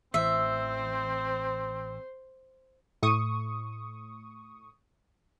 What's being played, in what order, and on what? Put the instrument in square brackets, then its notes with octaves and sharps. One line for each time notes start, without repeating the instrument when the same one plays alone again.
[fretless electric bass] A1 E3 [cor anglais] C4 [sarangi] C5 [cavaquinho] E5
[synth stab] A2 C#6 D#6